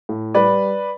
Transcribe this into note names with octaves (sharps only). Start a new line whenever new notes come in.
A2
G3 B4 D5